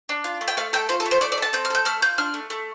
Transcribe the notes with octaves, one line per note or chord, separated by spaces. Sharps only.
D4
F4
A3
G5
A3 F5
A4 G5
F4 C5
A4
A3
C5
A3 D5
D5
A4 A5
C4 G6
F6
A4 G6
A3 F6
F4 G6
D4 F6
A3
A3